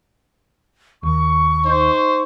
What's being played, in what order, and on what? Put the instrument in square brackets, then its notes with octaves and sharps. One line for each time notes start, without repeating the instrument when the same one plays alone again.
[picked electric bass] D#2 [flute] C#6
[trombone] D#4 [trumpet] C5